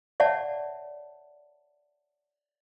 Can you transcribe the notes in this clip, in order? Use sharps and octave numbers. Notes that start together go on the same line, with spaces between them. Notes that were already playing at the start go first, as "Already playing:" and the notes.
C#5 D5 E5 F#5 A5